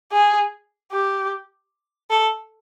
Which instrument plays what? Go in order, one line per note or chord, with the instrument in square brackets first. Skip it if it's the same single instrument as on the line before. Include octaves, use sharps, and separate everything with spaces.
[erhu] G#4
G4
A4